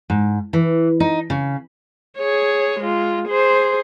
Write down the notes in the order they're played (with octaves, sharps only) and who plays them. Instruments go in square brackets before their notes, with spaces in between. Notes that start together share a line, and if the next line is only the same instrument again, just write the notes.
[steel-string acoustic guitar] G#2
E3
D#4
C#3
[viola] G#4 C#5
G#3 F4
G#4 C5